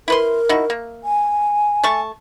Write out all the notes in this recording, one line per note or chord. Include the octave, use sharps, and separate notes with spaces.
E4 A#4 B4 C6
D#4 E4 F#4
A#3
G#5
A3 A5 C#6